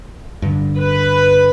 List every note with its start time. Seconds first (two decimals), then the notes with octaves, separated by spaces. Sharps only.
0.42 G2 D3
0.79 B4